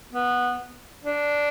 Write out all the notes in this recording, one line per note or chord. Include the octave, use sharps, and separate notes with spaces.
B3
D4